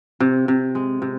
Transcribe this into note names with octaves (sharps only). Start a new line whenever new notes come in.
C3
C3
G#3
C3